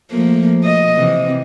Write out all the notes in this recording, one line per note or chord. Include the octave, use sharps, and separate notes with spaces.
F3 A3 A#3
D#5
C3 E3